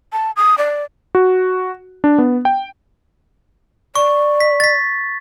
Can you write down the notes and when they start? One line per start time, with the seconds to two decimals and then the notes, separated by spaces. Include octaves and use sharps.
0.13 A5
0.36 D#6
0.58 D5
1.15 F#4
2.04 D4
2.18 B3
2.45 G5
3.96 D5 C#6
4.40 B6
4.60 A6 B6